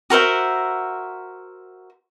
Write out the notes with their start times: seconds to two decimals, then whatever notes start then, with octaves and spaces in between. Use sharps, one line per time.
0.10 F#4 A#4 C5 E5